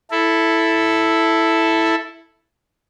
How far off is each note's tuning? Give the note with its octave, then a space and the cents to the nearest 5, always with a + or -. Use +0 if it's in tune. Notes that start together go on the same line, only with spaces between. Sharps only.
E4 +0 A4 +0